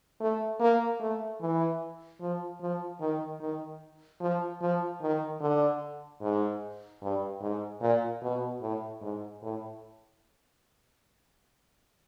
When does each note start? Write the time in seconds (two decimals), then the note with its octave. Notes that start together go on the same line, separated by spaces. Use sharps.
0.20 A3
0.60 A#3
1.00 A3
1.41 E3
2.21 F3
2.61 F3
3.01 D#3
3.40 D#3
4.20 F3
4.61 F3
5.02 D#3
5.41 D3
6.21 G#2
7.02 G2
7.42 G#2
7.82 A#2
8.22 B2
8.62 A2
9.02 G#2
9.42 A2